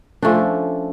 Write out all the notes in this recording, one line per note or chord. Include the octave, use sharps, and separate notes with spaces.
F3 A3 C#4 D4